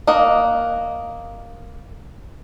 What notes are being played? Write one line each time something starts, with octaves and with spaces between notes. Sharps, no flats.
A#3 D#5 F#5